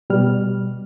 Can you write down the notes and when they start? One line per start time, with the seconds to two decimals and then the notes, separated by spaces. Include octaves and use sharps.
0.10 B2 G3 F6